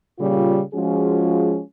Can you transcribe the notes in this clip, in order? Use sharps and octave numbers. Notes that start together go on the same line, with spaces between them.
A#2 C#3 G3 F4
F3 G#3 C#4 F4 F#4 G#4